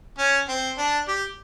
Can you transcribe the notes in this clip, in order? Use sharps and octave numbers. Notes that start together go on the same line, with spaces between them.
C#4
C4
D4
G4